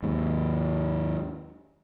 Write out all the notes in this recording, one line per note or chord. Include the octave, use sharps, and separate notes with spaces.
D#2 G#2